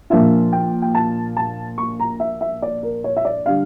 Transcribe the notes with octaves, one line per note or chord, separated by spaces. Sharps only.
A#2 F3 A#3 D4 F4 E5
G5
G5
A5
A5
C#6
A#5
E5
E5
D5
A#4
C#5
E5
D5
D3 G3 D4 F5